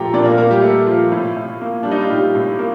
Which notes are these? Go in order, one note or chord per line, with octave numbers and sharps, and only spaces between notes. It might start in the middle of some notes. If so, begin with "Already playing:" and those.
Already playing: A#2 F3 A3 G4 G5 A#5
A#2 D4 D5
A#3 A#4
A#2 A#3 A#4
G3 G4
A3
F3 F4
A2
A2
A#3
G3 D4
D#4
F4
A2 G3 G4
A2
A#3